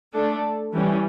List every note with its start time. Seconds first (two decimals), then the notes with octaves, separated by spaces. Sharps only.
0.13 A3 D4 A4
0.73 E3 G3 C#4